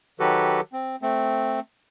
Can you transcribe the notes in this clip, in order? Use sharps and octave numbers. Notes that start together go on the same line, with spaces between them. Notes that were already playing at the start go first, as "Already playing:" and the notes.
D#3 F#3 F#4 G4 A4 B4
C4
A3 C4